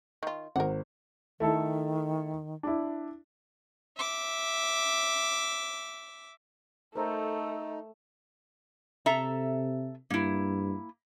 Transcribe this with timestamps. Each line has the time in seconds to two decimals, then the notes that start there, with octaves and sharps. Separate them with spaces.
0.23 D#3 F4
0.56 G#1 A#4 F#5
1.40 D#3 A3 E4 A4
2.63 D4 E4
3.97 E5 D6
6.95 A3 D#4 A4 A#4 C5 A#5
9.06 C3 A4 E5 A#5
10.10 G2 A#3 E4